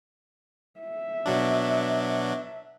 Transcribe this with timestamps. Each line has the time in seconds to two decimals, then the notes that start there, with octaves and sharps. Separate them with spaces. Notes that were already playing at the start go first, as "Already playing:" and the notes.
0.80 E5
1.26 B2 F#3 D4